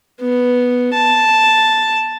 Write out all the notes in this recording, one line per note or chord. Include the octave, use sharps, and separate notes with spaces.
B3
A5